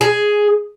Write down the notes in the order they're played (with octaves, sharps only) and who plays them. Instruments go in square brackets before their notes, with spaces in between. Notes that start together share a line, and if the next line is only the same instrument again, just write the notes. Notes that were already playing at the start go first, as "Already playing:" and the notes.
[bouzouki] G#4